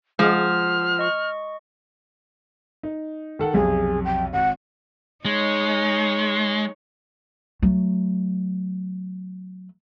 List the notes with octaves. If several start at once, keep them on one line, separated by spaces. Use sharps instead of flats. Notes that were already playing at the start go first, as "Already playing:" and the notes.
F3 G#3 F#5 D#6 F6 G6
D#5 C#6
D#4
D#3 A4 F#5
B1 F2 C3 G#4
G5
G#1 F#5
G#3 D#4 C#5
F#3 A3